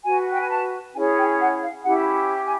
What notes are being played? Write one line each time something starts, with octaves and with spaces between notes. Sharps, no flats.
F#4 B4 G#5
G5
G#5
A5
C#4 E4 G#4 C#5 G#5
G5
F#5
F5
C#4 E4 G4 F#5
G#5